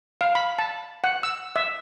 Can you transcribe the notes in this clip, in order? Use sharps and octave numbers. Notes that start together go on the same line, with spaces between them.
F5
B5
A5
F#5
E6
E5